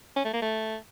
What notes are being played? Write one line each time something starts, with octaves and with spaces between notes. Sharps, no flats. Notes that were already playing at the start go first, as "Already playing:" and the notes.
C#4
A3
A#3
A3